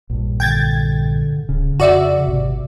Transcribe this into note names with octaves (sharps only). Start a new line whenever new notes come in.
A#1 G2
D3 G5 G#6 A6
D1 C#3
F2 C#3 F#4 D5 E5
G#1 C3